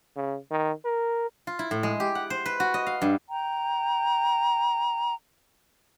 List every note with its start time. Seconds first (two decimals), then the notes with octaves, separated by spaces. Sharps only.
0.16 C#3
0.51 D#3
0.85 A#4
1.47 F4
1.59 E4
1.71 A2
1.83 G#3
2.00 G4
2.15 F#5
2.30 C5
2.46 B4
2.60 F#4
2.74 D#5
2.87 F5
3.02 G2
3.29 G5 A#5